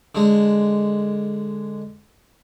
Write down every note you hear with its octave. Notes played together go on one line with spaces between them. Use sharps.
D3 G#3